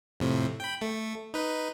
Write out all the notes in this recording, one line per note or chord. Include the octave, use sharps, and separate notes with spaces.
F2 A2 C3
G5 B5
A3
D#4 B4